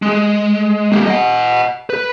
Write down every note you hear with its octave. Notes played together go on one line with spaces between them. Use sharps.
G#3
G3 A#3
D#5 F#5
B4